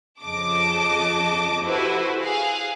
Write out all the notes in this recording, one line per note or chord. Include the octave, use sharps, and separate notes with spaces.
F2 C#3 D#5 A5 D6
E4 F#4 G4 A4 B4 C5
G#4 F5 F#6